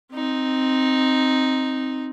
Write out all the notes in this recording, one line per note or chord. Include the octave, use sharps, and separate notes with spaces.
C4 D#4